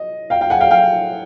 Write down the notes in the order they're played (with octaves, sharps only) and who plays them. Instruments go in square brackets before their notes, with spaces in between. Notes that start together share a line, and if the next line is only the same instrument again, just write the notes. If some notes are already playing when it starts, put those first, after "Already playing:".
Already playing: [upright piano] D#5
F5 G5
F5 G5
F#5 G#5
F5 G5
F5 G5